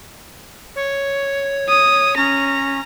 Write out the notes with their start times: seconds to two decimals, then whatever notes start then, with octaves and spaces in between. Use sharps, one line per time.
0.76 C#5
1.69 D#6
2.17 C#4 A#5